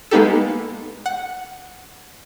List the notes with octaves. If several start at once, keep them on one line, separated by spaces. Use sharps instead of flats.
G#3 A#3 B3 D#4 G4 A4
F#5